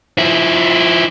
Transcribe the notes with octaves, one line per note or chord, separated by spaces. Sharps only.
F3 E4